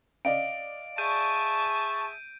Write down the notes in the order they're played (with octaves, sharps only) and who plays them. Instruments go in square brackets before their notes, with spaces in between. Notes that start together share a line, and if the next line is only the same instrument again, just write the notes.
[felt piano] D5 D#5 F5 [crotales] D7
[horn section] G#4 E5 A5 [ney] C#6 [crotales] G6 D#7